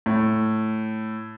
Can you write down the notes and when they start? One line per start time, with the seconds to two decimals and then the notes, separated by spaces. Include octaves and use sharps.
0.06 A2